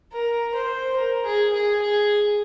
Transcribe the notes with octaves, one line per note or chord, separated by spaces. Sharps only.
A#4
C5
A#4
G#4
G#4
G#4